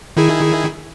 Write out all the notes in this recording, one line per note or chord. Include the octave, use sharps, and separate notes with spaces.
D#3 E4 G#4